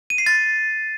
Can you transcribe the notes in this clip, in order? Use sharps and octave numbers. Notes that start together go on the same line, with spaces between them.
D#7
C7
A6